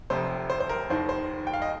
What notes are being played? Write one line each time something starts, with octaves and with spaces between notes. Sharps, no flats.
F1 F2 C3 C5
C5
C5
A#4
F1 D#2 D#3 C5
C5
G5
F5
D#5